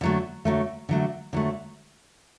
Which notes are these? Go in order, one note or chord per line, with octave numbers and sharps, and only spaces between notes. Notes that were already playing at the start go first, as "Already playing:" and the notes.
D3 F#3 A3
D3 F#3 A3
D3 F#3 A3
D3 F#3 A3